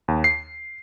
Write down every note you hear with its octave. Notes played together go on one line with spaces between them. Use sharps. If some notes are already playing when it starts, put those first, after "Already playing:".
D#2
C7